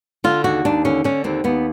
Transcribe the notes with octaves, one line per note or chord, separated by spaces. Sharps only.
D3 F4
D#2 F#4
D#2 D4
D3 C#4
D3 C#4
D#2 C4
D#2 B3